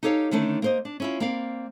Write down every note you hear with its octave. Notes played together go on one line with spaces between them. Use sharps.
D#4 G4 A4 C#5 F5
D3 D#3 A3 C#4 D4
A#3 C5 D#5
D4
C#4 E4 F4
A#3 C4 D5 F5